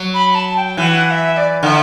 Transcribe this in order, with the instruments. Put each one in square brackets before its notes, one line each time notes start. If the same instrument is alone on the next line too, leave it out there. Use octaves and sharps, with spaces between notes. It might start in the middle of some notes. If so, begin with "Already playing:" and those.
Already playing: [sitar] F#3
[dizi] B5
A5
G5
[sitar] E3 [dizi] G5
[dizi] F#5
F#5
E5
E5
D5
[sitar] D3 [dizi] E5 F#5